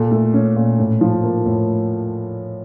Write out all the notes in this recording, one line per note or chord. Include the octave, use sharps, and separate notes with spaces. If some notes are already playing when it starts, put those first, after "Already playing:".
Already playing: A#2 A4
A3
C#4
A#2
A2
F3
A#3
A2